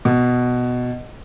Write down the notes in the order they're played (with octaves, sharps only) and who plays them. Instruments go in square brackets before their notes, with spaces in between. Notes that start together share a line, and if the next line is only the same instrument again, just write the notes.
[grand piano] B2